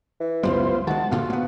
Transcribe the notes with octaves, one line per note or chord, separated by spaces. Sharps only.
E3
C#2 F#2 G3 B3 F4 C5
D#3 G#3 F#4 A5
G2 A#2 D3 F4 F#4
A#3 B3